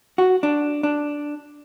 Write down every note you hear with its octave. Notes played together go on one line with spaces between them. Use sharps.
F#4
D4
D4